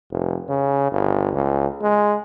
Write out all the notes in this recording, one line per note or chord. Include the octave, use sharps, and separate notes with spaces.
F1
C#3
G1
C#2
G#3